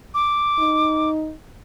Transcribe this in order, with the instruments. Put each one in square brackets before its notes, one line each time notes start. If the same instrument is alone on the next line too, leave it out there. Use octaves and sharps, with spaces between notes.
[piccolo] D6
[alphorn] D#4